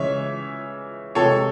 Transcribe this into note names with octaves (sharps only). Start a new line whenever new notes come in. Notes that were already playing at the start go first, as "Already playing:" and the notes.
Already playing: C#3 E3 G#3 C#5 E5
C3 E3 G#3 A4 C#5